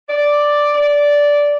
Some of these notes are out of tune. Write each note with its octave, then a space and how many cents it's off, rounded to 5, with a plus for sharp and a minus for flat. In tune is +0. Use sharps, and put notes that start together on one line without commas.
D5 +0
D5 -10